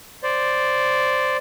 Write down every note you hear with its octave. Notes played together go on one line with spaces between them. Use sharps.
C5 D5